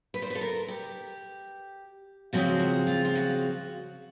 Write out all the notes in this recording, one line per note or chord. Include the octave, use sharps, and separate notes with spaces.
B4
C5
B4
A4
A#4
G4
C#3 F3 G#3 C4 F4 F#4
F#4
F4
F4
F#4